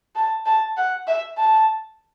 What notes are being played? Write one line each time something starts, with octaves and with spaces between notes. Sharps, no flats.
A5
A5
F#5
E5
A5